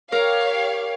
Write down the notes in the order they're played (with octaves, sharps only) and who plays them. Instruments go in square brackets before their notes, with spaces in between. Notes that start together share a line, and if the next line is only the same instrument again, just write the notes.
[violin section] G4 C#5 F5 [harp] A#4